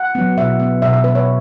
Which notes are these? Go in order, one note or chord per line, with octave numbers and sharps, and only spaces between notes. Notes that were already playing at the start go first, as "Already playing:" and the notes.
Already playing: F#5
F#3 B3
B2 E5
B3
B2 E5
E5
B3 B4
C#5